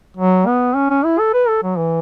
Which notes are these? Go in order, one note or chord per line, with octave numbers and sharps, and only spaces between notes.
F#3
B3
C#4
C#4
E4
A4
B4
A4
F#3
E3